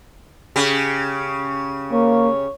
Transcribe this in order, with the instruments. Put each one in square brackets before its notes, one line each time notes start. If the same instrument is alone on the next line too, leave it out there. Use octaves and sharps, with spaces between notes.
[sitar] C#3 G4
[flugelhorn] A#3 [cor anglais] C#5